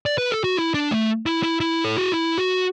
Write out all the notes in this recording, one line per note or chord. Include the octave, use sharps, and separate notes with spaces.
D5
B4
A4
F#4
E4
D4
A3
E4
E4
E4
A4
F#4
E4
F#4